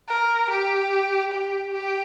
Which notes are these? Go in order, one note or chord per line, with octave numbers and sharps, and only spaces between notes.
A#4
G4
G4
G4